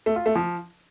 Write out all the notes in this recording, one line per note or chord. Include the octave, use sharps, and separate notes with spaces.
A3
F4
A3
F3